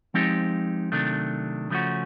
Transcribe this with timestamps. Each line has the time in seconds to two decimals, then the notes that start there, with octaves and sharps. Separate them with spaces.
0.14 F3 G#3 C4 D#4 G4
0.92 C3 D#3 F#3 A3 D4
1.70 C#3 F3 A3 C#4 F#4